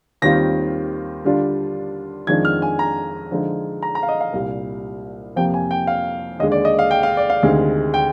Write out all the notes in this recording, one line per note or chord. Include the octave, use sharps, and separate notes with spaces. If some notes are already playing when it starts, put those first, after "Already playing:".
D#2 D#3 G3 C4 F4 A#6
D3 G3 D4 F4
F2 D#3 G#3 D4 F4 G#6
F6
G#5
A#5
D3 F3 G#3 D#4
A#5
A#5
F5
D#5
F5
C2 A#2 G3
F2 C3 F3 A#3 G5
G#5
G5
F5
D#2 D3 G#3 D#5
D5
D#5
F5
G5
F5
D5
F5
D2 C3 D#3 G#3
G5